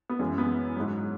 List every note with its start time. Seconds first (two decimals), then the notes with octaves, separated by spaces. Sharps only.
0.09 B3
0.19 F#2 E3 G#3
0.38 B3
0.76 G#2 F#3